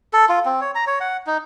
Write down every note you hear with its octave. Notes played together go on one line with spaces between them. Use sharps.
A4
F4
C4
C#5
A#5
C#5
F#5
D#4